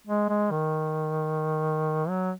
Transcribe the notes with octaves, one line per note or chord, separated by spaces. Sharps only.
G#3
G#3
D#3
F#3